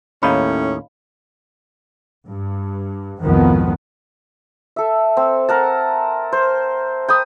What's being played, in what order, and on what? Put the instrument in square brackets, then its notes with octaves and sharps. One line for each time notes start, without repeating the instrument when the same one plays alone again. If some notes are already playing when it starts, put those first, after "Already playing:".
[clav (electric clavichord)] D#2 D#4 [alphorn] A2 [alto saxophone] C#4 [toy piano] C#5 F5 B5
[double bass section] G2
C2 F2 G#2 D#3 F3 B3
[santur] A4 E5
C4
A#4 F#5 A5
C5
G5 B5 D#6